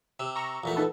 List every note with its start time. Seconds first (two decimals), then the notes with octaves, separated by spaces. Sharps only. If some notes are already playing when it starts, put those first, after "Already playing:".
0.20 C3 E6
0.35 A#5 C#6 E6
0.64 A#1 E2 A3
0.76 D#4 A4 B4